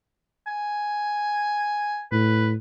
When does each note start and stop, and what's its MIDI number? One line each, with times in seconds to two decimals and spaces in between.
0.47 2.02 80
2.12 2.55 45
2.12 2.48 71